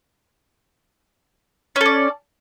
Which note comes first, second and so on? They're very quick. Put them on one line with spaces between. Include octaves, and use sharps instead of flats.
C#4 A4 D5